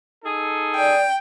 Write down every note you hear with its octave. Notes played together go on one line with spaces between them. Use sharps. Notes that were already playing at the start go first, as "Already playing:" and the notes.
D#4 G#4 A4
D5 G5